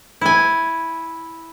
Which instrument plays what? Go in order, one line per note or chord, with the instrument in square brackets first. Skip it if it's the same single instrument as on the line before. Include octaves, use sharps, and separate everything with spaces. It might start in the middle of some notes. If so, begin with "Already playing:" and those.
[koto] E4 G#5